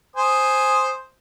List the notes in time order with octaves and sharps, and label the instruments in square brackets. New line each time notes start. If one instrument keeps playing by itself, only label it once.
[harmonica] C5 G#5 D#6